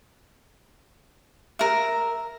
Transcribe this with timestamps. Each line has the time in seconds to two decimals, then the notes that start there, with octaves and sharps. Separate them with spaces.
1.59 A#4 E5